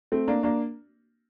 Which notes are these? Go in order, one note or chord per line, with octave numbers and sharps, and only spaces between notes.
A3 C4
A#3 D4
A#3 D4